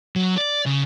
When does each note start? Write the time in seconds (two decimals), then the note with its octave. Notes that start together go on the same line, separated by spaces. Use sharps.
0.16 F#3
0.37 D5
0.65 C#3